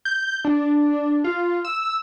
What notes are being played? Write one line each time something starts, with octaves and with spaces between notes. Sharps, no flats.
G6
D4
F4
E6